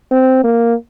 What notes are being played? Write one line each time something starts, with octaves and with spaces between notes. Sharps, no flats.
C4
A#3